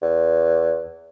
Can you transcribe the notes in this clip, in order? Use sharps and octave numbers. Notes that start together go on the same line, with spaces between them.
E2